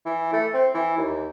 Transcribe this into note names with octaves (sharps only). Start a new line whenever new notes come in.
E3
A3
C4
E3
D#2